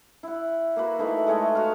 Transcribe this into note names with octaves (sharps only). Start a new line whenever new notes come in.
E4 F#5
A#3 F#4 B4
E3 A3 D#4 B5
G#3 A3 C#5 D#5
F#4 F5